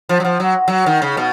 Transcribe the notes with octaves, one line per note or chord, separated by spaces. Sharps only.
F3
F#3
F3
F#3
F#3
D#3
C#3
B2